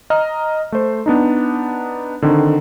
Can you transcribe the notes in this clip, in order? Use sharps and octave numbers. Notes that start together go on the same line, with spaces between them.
D#5 A#5 F6
A3 C5
B3 D4 D#4
D3 D#3 C4